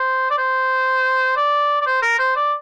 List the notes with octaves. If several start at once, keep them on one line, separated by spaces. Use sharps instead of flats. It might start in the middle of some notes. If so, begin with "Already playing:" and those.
Already playing: C5
D5
C5
D5
D5
C5
A#4
C5
D5